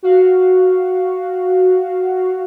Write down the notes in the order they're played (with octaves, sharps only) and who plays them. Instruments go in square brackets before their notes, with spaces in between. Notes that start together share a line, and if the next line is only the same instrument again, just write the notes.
[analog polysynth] F#4 F5